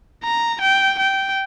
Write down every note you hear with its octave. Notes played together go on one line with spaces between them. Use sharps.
A#5
G5
G5